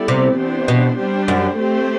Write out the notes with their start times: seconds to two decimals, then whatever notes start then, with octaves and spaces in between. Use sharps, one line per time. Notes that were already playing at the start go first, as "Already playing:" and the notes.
Already playing: G3 B3 E4 A4 D5
0.08 C3
0.37 E3 B3 D4 G4 C5
0.68 B2
0.98 G3 D4 G4 C5
1.28 F#2
1.57 A3 C4 G4 C5